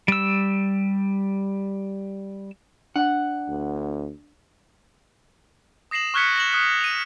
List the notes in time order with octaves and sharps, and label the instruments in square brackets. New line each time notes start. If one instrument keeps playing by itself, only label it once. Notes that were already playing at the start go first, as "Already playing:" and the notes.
[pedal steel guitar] G3 E6
[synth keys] D4 [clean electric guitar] F#5
[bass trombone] D2
[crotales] D#6 A#6 C7 E7 F#7
C#6 F6 F#6 G#6 B6 C#7
A#6 E7 F#7
D#6 F#6
D#7 F7